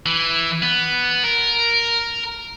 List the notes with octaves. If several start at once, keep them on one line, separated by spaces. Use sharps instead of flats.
E3
B3
A#4